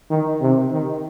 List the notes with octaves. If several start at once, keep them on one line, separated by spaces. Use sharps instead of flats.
D#3
C3
D#3